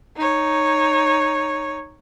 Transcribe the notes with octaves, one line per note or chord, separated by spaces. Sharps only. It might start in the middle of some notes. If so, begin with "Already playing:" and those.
D#4 C#5